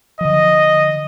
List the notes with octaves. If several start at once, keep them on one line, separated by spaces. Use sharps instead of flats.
D3 F3 D#5